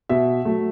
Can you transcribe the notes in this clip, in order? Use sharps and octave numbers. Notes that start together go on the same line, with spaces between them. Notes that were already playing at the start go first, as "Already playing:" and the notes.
B2 E5
F#3 A3